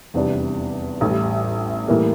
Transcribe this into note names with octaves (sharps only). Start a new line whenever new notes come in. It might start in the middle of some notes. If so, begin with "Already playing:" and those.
F1 E2 C3 G3 D4
A1 A2 G3
A2 E3 G3 A#3